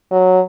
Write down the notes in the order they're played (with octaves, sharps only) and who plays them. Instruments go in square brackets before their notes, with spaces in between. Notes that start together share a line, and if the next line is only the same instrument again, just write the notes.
[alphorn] F#3